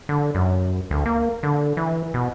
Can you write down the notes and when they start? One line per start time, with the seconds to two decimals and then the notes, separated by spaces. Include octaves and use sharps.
0.09 D3
0.35 F#2
0.91 D2
1.06 A#3
1.43 D3
1.77 E3
2.14 B2